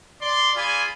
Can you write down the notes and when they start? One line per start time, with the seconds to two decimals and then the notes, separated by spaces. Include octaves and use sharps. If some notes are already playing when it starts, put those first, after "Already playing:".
0.21 D5 C6
0.56 F4 G#4 D5 G#5 B5